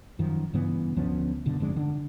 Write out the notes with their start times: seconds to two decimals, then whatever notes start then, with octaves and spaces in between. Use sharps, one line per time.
0.19 F#2 D#3 F3
0.53 G2 C#3 E3 B3
0.96 D2 F3 B3 C#4
1.46 F#1 B2 D3
1.60 G1 F2 G#3 D4
1.76 D3 D4